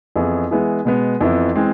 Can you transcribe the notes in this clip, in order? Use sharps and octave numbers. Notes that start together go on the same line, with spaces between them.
F2 E3 B3 E4 G#4
E3 G#3 B3 E4 G#4
B2 G#3 B3
F2 E3 B3 E4
E3 G#3 C4